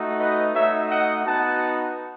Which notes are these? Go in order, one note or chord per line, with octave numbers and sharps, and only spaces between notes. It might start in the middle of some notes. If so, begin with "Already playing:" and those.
Already playing: A3 D#4 F#4
B4 D#5
A3 D#4 F#4 C#5 E5
D#5 F#5
B3 D#4 F#4 F#5 A5